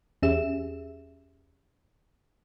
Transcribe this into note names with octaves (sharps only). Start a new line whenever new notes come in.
E2 C#4 G4 G#4 E5 E7